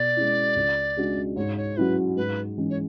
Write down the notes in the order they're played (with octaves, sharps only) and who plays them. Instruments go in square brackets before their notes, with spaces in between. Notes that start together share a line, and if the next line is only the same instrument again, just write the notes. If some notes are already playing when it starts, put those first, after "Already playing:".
Already playing: [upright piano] B2 [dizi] D5
[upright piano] G#3 C#4 E4
C#2
C#3 G#3 D4 F#4
[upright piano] G#2 [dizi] C#5
[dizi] C#5
[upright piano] F#3 C#4 E4 [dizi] B4
[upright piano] G#2 [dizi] B4
[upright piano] E3 G#3 C#4
[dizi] C#5